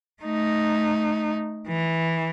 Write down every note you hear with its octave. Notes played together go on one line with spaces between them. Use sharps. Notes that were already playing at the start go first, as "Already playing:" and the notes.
A3 D#4
E3